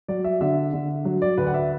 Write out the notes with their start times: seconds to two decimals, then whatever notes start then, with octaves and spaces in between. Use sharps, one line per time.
0.08 F#3 D5
0.24 E5
0.41 D3 E5
0.73 D3
1.05 F#3
1.22 D5
1.37 D2 B4
1.47 F#5
1.54 E5